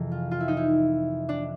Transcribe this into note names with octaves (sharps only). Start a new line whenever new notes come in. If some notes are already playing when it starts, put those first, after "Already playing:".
Already playing: F2 C3 E3 G#4 A#4
F4
F4
E4
D#4
E4
D4